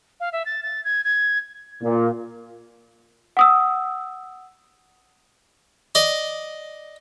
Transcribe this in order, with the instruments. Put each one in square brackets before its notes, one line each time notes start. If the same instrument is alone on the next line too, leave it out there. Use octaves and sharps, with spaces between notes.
[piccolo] F5
E5
A6
A6
G#6
G#6
[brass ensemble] A#2
[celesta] F#5 D#6 E6
[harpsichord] D5 D#5